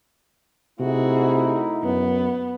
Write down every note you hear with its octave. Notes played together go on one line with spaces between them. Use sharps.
C3 A3 D#4 E4 F#4 G#4
F#2 B3